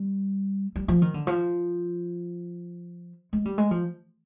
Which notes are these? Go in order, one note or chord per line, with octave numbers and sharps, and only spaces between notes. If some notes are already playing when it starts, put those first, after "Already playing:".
Already playing: G3
G3
F3
D#3
D3
F3
G#3
G3
G#3
F3